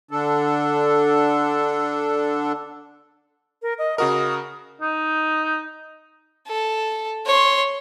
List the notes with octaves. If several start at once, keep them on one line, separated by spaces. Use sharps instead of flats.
D3 D4 A4
A#4
D#5
C#3 F#4 A#4 D#6
D#4
A4
C#5 C6